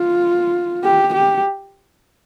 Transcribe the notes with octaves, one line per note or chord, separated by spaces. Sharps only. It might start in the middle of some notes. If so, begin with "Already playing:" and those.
Already playing: F4
G4
G4